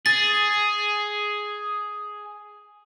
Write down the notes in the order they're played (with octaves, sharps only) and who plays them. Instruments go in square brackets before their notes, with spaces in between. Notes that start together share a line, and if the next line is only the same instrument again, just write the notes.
[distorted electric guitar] G#4 [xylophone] A6